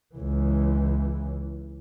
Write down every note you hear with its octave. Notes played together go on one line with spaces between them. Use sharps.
C#2 E3